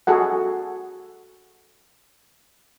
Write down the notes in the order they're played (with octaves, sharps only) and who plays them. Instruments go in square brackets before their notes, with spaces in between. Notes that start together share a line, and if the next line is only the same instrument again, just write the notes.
[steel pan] F#4 G#4 A4 F#5